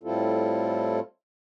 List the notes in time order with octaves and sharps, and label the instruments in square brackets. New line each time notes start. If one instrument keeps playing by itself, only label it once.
[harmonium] A2 G3 C4 E4 F4 A4